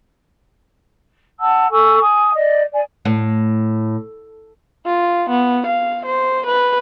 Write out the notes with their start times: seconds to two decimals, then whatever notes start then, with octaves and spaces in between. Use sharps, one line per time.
1.40 F#5 A5 E6
1.71 A4 G#5 C#6 E6
2.00 G#5 D#6
2.36 D5 D#5
2.73 D5 G#5
3.05 A2
4.86 F4
5.30 B3
5.67 F5
6.06 C5
6.46 B4